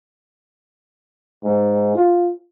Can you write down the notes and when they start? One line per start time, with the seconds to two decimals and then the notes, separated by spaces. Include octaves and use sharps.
1.44 G#2
1.95 F4